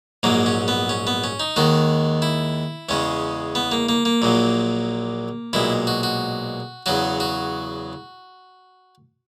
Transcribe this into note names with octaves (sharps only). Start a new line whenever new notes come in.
A#1 G#2 F#3 A#3
C#4
B3
C#4
B3
C#4
D#4
D#2 D#3 G#3 F#4
E4
E2 C#3 G#3 C#4
B3
A#3
A#3
A#3
A#1 A#2 F#3
B1 A#2 G#3 E4
F#4
F#4
E2 C#3 F#3 F#4
F#4